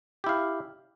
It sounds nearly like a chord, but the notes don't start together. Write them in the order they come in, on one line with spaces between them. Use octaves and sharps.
G4 E4 F5